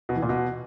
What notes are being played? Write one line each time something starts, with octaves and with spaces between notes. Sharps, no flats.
B2
E3
A#2
B2